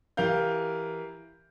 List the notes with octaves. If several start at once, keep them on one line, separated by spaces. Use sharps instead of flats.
E3 G4 A#4 F5 G6